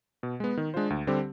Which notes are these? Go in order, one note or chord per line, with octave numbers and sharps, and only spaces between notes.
B2
G#3 B3
D#3
G#3 D4 F4 C5
D2
D3 G3 C4 G4